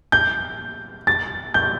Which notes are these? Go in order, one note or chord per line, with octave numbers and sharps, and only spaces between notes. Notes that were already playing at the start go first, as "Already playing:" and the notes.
G6
A6
G6